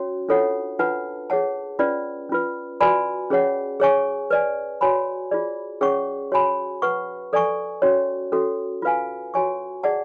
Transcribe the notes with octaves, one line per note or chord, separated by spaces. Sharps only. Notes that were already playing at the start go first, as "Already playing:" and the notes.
Already playing: C#4 F#4 C#5
D4 F4 A4 C#5 F#5
D4 F4 B4 F#5 A5
G#4 C#5 F#5 A5
C#4 F4 B4 D5
C#4 F4 B4
F#4 B4 D5 G#5 B5
C#4 G#4 C#5 F#5
G#4 C#5 G#5 C#6
B4 D5 G#5
F#4 C#5 G#5 B5
F4 G#4 D5
C#4 G#4 C#5 F#5 C#6
F#4 C#5 G#5 B5
B4 F#5 C#6
A4 D5 G#5 C#6
C#4 F#4 C#5
C#4 F#4 A4
F4 B4 F5 G#5
F#4 C#5 G#5 C#6
G#4 D5 F#5 A5